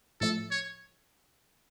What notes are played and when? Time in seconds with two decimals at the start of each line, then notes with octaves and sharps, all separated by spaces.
0.21 A2 F3 A3 A4
0.51 C#5